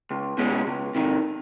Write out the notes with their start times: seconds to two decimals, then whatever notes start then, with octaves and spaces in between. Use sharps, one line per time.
0.11 C#2
0.38 B2 G#3 C#4
0.67 C#2
0.95 C3 D#3